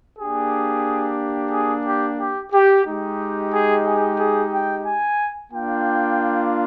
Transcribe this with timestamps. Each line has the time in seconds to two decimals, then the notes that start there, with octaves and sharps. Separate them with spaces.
0.19 A#3 D4 G4 G#4
1.52 G#4
1.86 G4
2.19 G4
2.53 G4
2.85 G#3 D#4 G4
3.52 G#4
3.85 G#4
4.19 G#4
4.52 G5
4.85 G#5
5.52 A#3 D4 F4 G5